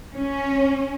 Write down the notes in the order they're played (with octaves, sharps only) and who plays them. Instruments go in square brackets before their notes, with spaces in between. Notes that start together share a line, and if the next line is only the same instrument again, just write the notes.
[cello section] C#4